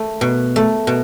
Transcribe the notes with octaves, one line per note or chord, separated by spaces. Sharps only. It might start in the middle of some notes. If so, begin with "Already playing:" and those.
Already playing: A3
B2
A3
B2